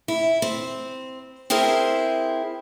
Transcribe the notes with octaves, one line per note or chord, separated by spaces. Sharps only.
E4
C4
C4 E4 G#4 A#4 C5